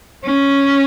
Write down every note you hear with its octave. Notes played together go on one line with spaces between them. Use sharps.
C#4